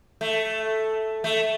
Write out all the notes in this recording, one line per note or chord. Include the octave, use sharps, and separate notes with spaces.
A3
A3